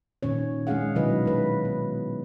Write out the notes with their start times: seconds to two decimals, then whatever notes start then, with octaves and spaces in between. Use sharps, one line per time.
0.23 A#2 D#3 C#4 C#5
0.67 G#3 C#4 D4 G#4 F5 F#5
0.95 B2 D#3 F#3 E4 B4 D#5
1.25 G#3 B4
1.65 B3